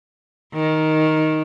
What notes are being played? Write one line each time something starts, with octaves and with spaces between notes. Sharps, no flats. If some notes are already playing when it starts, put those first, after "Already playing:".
D#3